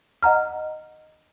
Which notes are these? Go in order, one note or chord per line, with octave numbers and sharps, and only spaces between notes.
D#5 F#5 A#5 F6